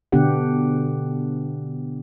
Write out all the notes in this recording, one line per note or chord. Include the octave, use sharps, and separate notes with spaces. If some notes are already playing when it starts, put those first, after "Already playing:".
B2 D3 B3 D4 G4 F#5